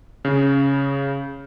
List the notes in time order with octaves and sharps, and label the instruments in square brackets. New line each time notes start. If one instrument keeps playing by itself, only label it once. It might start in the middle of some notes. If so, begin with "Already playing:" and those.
[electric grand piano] C#3